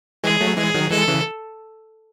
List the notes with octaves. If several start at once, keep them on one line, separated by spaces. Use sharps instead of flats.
E3 G#3 G#4
F#3 A3
E3 G#3 G#4
D#3 F#3
E3 G#3 A4
C#3 E3